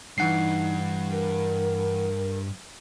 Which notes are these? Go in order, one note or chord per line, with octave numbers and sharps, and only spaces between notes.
G2 E3 D#4 F#5 C7
A#4